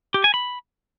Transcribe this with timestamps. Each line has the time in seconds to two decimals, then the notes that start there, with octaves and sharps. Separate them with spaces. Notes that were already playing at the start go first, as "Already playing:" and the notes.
0.14 G4
0.24 G#5
0.34 B5